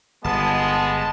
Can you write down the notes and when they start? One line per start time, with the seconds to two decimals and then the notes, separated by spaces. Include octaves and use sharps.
0.25 G1 G#3 B3 A5